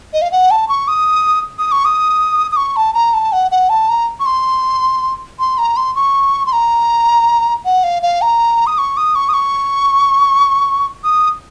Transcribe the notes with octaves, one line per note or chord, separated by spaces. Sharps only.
D#5
F5
F#5
A5
C#6
D#6
D#6
C#6
D#6
D#6
C#6
A5
A#5
A5
F#5
F#5
A5
A#5
C#6
C6
C6
A#5
C6
C#6
C6
A#5
F#5
F5
F5
A#5
D#6
C#6
D#6
C#6
D#6
C#6
D#6